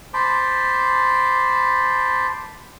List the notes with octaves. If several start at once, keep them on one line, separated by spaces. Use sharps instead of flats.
C5 A5 B5 C6 D6